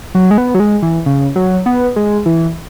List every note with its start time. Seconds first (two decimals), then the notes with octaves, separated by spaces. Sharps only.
0.15 F#3
0.31 G#3
0.38 B3
0.54 F#3
0.60 G#3
0.82 E3
1.06 C#3
1.36 F#3
1.66 B3
1.96 G#3
2.26 E3